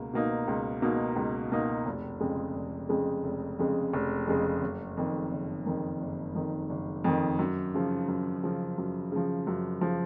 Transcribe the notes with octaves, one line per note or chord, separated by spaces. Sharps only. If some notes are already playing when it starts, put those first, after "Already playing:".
Already playing: C#2 B2 A#3
B2 A#3 D#4
C#2
B2 A#3 D#4
C#2
B2 A#3 D#4
F1
F2 C#3 G#3
F1
F2 C#3 G#3
F1
F2 C#3 G#3
F1
F2 C#3 G#3
F#1
F2 D#3
F#1
F2 D#3
F#1
F2 D#3
F#1
F2 D#3
F#2
C#3 F3
F#2
C#3 F3
F#2
C#3 F3
F#2
C#3 F3